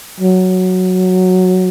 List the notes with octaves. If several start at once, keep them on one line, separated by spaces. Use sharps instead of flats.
F#3